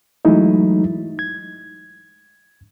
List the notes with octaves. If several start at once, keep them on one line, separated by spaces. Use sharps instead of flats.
E3 F#3 G#3 A3 D#4 E4
G#6